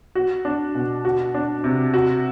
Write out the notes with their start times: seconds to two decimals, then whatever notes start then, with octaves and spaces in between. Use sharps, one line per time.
0.15 F#4
0.45 D4
0.75 B2
1.05 F#4
1.34 D4
1.64 C3
1.94 F#4